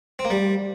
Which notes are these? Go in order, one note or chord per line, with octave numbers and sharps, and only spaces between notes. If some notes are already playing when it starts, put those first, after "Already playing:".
C4
A#3
G3